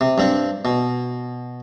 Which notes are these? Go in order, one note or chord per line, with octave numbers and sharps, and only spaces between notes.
C3
G2 C4
B2